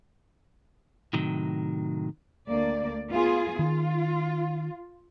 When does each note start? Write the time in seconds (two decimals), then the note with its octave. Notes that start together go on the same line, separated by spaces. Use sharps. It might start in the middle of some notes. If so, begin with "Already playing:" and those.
1.13 A2 C3 D#3 F#3
2.49 D2 A#3 D5
3.10 B3 F4 G#4
3.59 D#3 F4